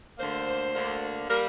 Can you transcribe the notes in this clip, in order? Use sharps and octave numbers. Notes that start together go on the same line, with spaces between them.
D2 D3 A#3 C5
D2 D3 A#3
G3 A#3 A#4